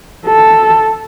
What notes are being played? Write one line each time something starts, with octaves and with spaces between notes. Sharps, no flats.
A4